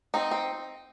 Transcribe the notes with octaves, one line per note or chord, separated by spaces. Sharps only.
C4 D#4
C4